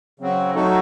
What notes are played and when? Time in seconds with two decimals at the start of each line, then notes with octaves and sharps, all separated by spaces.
0.20 C#3 F#3 C4 F#4
0.55 F#3 A3 D#4 F#4 A4